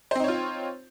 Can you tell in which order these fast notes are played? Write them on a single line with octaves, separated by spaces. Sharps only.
C5 C4 D#4 C#5 F4